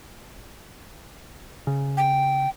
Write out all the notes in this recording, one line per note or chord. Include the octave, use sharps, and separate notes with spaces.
C#3
G5